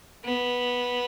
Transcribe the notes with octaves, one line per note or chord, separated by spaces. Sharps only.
B3